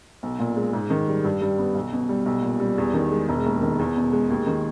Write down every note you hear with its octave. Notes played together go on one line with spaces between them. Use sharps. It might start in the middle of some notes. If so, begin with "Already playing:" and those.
B1
A#2
G#3
G#2
D#3
G3
G2
G3
B3
B1
B2
G3
B1
A#2
G3
E2
D#3
G#3
E1
D#2
D#3
E2
B2
G#3
D#2
D#3